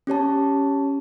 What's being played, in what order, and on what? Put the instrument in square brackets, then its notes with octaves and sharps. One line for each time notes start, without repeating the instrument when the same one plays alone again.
[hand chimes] C#4 G4 C#5 A5